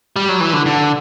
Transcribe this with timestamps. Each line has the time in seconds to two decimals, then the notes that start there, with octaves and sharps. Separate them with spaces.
0.16 G3
0.29 F#3
0.41 E3
0.53 D3
0.66 D3